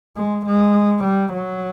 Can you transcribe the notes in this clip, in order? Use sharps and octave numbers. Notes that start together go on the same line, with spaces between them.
G#3
G#3
G3
F#3